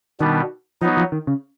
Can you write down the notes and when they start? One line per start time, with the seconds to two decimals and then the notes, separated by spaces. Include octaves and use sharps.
0.20 B2 D#3 G3 B3 D4
0.82 F3 F#3 B3 D#4
0.97 F3
1.12 D#3
1.27 C#3